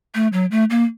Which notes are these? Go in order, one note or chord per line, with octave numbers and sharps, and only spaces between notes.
A3
F#3
A3
A#3